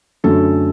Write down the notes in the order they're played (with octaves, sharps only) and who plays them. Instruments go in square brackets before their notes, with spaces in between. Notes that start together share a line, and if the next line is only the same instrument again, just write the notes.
[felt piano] F#2 D3 F#3 A3 C#4 A4